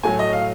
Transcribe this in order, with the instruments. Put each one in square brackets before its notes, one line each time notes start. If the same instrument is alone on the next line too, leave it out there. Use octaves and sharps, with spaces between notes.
[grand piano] A2 F#3 A3 G#5
D#5
F5